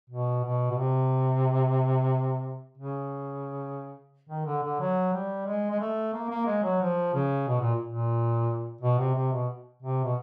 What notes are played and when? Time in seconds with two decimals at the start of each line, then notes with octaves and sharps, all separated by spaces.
0.10 B2
0.44 B2
0.71 B2
0.78 C3
2.77 C#3
4.29 D#3
4.45 D3
4.63 D3
4.80 F#3
5.13 G3
5.46 G#3
5.71 G#3
5.80 A3
6.14 A#3
6.30 A#3
6.46 G#3
6.63 F#3
6.81 F3
7.14 C#3
7.48 B2
7.60 A#2
7.87 A#2
8.81 B2
8.98 C3
9.15 C3
9.32 B2
9.83 C3
10.04 B2